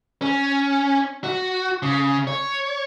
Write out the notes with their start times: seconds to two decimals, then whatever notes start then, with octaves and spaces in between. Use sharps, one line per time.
0.22 C#4
1.24 F#4
1.82 C#3
2.27 C#5